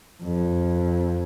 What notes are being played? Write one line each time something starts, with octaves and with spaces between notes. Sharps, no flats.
F2